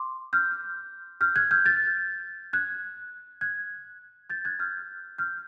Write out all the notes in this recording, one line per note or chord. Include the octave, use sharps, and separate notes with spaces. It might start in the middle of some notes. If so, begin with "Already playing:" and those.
Already playing: C6 D6
F6 G6
F6 G6
F#6 G#6
F6 G6
G6 A6
F#6 G#6
F#6 G#6
G6 A6
F#6 G#6
F6 G6
F6 G6